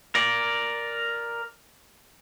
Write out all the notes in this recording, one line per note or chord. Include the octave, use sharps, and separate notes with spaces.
A#4 D5